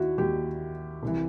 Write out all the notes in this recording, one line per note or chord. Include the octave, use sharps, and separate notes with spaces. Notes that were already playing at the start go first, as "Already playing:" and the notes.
Already playing: D#2 D#3 E4 F#4
D#2 D#3 G4
C2 C3 E3